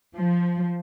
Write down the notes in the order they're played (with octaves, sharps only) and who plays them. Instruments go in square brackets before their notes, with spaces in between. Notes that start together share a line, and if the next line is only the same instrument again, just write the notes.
[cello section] F3